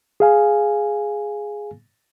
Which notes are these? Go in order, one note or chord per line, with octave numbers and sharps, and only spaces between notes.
G#4 F5 G#5